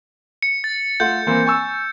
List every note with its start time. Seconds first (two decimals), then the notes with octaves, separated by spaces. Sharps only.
0.43 C#7
0.64 A6
1.00 A3 F4 F#5 G6
1.27 E3 A#3 C4
1.46 G#5 C#6 E6